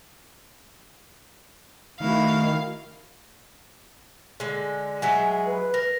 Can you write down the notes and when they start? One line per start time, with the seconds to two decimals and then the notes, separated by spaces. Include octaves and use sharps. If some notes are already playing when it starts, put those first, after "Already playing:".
2.00 D#3 A3 E4 F#4 F5
4.40 D3 G#3
5.02 F#3 G#3 E5 G#5
5.46 B4
5.74 A#4